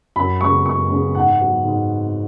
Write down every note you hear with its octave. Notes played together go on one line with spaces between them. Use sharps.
F#2 B5
C#3 G#3 B3 C#6
F#2 C#6
C#3 G#3 B3
G#2 F#5
F#3 B3
G#2